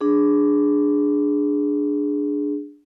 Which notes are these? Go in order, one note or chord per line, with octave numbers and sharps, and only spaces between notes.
D4 G#4